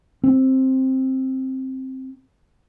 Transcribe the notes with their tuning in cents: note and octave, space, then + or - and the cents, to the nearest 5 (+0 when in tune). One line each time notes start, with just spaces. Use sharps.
C4 +10